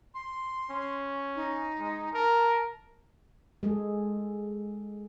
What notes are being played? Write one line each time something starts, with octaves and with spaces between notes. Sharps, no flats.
C6
C#4
D#4
G#3
A#4 A5
G#3 G#4 A4